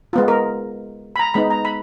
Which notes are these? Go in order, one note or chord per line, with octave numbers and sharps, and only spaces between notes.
G#3 B3 F4
A#4
B5
A#5
G#3 B3 D#4 B5
A#5
B5